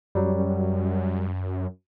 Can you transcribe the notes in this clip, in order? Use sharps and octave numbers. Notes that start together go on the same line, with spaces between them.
F#2 F#3 G3